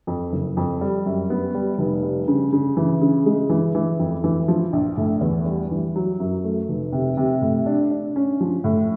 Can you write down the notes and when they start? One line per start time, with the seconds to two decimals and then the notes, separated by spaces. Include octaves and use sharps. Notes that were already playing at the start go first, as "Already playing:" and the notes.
0.07 F2
0.32 F#1
0.57 F2
0.81 G3
1.06 F#2
1.30 B3
1.55 G3
1.78 F1
2.03 G3
2.28 C#3
2.53 C#3
2.77 E3
3.01 C#3
3.26 G#3
3.50 E3
3.75 E3
3.99 F2
4.24 E3
4.48 F3
4.73 A#1
4.97 A2
5.21 E2
5.45 G3
5.71 E3
5.96 F#3
6.20 F#2
6.44 A3
6.69 F1
6.92 C3
7.17 C3
7.42 A2
7.66 D4
7.91 D4
8.16 C#4
8.41 F3
8.64 A2